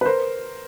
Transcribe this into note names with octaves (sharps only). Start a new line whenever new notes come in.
B4
A#4 C5